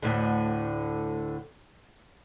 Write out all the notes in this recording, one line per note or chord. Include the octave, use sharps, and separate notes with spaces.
D2 A2 D3